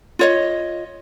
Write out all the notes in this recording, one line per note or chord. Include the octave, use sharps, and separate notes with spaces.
F4 C#5 D#5